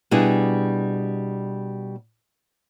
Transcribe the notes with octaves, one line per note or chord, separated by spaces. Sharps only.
B2 G3 D4 E4 G#4